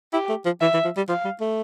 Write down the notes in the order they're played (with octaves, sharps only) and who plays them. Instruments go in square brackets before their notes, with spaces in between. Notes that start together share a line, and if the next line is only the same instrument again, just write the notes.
[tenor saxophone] E4 [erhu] G4
[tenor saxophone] A3
F3
[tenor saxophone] E3 [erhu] E5
[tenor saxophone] E3
F3
G3
[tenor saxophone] F3 [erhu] F5
[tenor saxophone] G3
A3